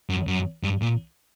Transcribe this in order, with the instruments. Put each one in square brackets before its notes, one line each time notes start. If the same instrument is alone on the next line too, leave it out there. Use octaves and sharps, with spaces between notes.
[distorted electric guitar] F#2
F#2
G2
A#2